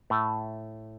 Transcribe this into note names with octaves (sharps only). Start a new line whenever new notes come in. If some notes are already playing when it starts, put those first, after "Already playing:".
A2 A3